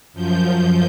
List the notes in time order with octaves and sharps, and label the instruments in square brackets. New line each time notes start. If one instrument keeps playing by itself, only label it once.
[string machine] F#2 F3 G6